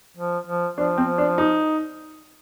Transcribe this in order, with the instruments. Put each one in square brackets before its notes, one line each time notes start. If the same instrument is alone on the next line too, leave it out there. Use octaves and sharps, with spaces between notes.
[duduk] F3
F3
[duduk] F3 [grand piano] D4
[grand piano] C4
D4
D#4